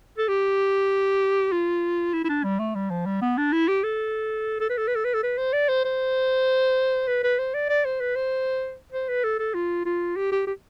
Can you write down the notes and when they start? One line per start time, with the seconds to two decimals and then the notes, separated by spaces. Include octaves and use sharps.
0.18 A4
0.28 G4
1.52 F4
2.14 E4
2.24 E4
2.29 D4
2.44 G3
2.59 A3
2.75 G3
2.90 F3
3.06 G3
3.21 B3
3.38 D4
3.52 E4
3.68 G4
3.83 A4
4.60 A4
4.70 B4
4.78 A4
4.88 B4
4.95 A4
5.04 B4
5.14 A4
5.23 B4
5.38 C5
5.53 D5
5.69 C5
5.84 C5
7.08 B4
7.23 B4
7.39 C5
7.54 D5
7.69 D5
7.85 C5
8.00 B4
8.16 C5
8.92 C5
9.09 B4
9.24 A4
9.39 A4
9.54 F4
9.85 F4
10.16 G4
10.32 G4
10.47 G4